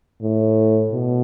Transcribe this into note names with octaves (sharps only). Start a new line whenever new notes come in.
A2
B2